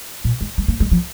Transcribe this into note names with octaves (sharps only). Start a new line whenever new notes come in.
A#2
G#3
G#3
A#3
G#3
F3